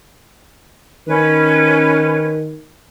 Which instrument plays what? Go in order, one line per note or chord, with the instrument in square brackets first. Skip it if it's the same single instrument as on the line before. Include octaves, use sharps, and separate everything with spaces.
[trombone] D#3 [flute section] C#4 B4